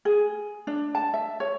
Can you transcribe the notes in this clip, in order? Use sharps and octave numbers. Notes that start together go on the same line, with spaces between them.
G#4
D4
A5
E5
C#5